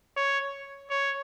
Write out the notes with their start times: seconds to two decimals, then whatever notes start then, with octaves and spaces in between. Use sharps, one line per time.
0.17 C#5
0.90 C#5